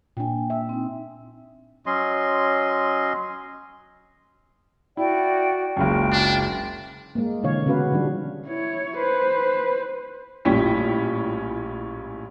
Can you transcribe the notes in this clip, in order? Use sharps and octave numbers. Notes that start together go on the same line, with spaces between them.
A#2 D4 G5 G#5
E5
C4 D#4
F#3 C#4 D#5 C6
E4 F#4 D5 G5
F#1 C#2 F#2 G5
D4
G#3 A#3
B2 D3 E3 C#5 F5
C#3 B3 C#4 F#4 B4 F5
D#3 F3 G3 D4
E4 C#5
B4 C5
A#1 A2 G3 C#4 G5 B6